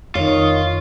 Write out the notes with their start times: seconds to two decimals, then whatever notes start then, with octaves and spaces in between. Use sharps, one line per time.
0.15 F2 D#3 F4 C#5